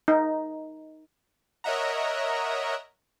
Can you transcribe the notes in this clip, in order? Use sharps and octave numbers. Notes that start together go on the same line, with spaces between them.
D#4
A#4 C#5 D#5 E5 F#5 A#5